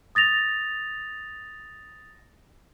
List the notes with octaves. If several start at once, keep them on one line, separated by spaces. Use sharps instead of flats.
D#6 A6 A#6 F7